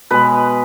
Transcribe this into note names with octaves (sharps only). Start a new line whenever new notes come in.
B2 G#3 B4